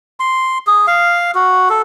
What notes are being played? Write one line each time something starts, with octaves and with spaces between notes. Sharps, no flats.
C6
G#4
F5
F#4
A4